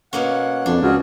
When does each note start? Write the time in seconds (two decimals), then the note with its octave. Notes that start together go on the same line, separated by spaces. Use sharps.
0.13 B2 A#3 C#4 F#5
0.66 F2 D4
0.82 C#2 F4 F#4 G#4